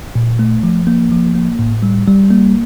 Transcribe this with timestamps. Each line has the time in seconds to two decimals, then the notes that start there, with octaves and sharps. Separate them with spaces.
0.15 A#2
0.39 A3
0.63 F3
0.87 A#3
1.12 F3
1.35 A#3
1.59 A2
1.83 G3
2.07 G3
2.30 A#3